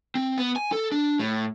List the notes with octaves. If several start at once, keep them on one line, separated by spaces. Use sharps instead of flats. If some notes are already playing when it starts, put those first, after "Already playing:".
C4
B3
G#5
A4
D4
A2